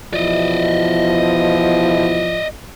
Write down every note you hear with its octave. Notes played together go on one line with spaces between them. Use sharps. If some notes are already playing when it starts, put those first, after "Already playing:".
E2 B2 F3 E4 D5 D#5